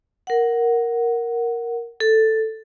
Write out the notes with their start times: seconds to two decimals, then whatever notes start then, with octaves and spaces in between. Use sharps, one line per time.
0.27 A#4 F#5
2.00 A4